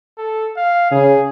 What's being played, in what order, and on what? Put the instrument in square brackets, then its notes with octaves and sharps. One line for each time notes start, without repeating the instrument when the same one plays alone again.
[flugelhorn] A4
F5
[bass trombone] C#3 [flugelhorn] G#4